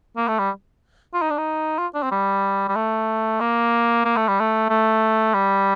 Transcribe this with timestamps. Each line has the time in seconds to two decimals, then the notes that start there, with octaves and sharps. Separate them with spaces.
0.17 A#3
0.28 A3
0.39 G3
1.14 F4
1.22 D#4
1.30 D4
1.38 D#4
1.78 F4
1.95 D4
2.03 C4
2.12 G3
2.68 G3
2.76 A3
3.41 A#3
4.05 A#3
4.17 A3
4.28 G3
4.40 A3
4.70 A3
5.34 G3